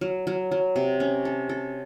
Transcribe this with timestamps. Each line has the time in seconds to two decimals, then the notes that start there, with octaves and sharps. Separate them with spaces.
0.01 F#3
0.27 F#3
0.51 F#3
0.76 C3
1.00 C#4
1.25 A4
1.49 A4